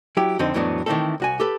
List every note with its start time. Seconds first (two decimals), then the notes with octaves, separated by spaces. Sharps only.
0.17 F#3 E4 G4
0.39 F2 D3 C4 D#4 C5
0.54 F2 A2 E3 F#3 B3 D4
0.86 D#3 E3 G3 A3 C4 A4
1.20 C2 F#4 G#5
1.40 G4 A4 B4